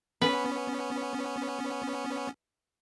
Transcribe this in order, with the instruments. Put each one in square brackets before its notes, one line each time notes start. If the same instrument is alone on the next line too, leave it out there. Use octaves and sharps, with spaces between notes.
[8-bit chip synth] B3 C#4 [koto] B4